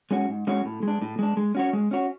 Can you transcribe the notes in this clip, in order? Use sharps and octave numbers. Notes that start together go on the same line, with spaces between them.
G#3 C#4 F#4 C#5
G#2
G#3 C#4 F#4 C#5
A2
G#3 D4
A2
G#3 D4
G#3
C#4 F#4 C#5
G#3
C#4 F#4 C#5